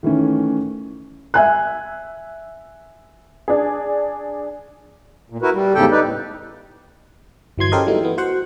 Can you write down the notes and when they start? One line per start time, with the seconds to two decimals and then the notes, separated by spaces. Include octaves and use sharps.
0.03 D#3 E3 A3 C#4
1.34 E5 G#5 F#6
3.48 D4 G#4
5.30 A#2
5.42 E4 F#4 A#4 B4
5.54 G3
5.75 E2 G#2 C#3 G4 A4 G5
5.91 D#4 B4 D5
6.04 A2
7.58 G1 E3 F#3 C6 G#6
7.72 C#4 G4 A4 A#4 C5 D#5
7.87 E3 F#3 G3 A3 A#3 D#4
8.03 E3 B3
8.18 F#4 C5 F#5